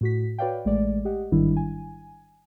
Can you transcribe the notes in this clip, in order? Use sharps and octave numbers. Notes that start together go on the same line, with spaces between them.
A2 F#4 B6
F#4 B4 C#5 D5 F5 G5
A1 G#3 A3 D5
G4 D#5 F#5
A1 G#2 D#3 G3 D4 E4
G#5